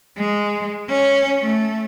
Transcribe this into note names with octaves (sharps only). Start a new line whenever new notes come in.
G#3
C#4
A3